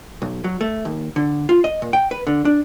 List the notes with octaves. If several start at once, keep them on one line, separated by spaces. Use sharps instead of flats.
B1
F#3
A3
D#2
D3
F4
D#5
A#2
G5
B4
D3
D4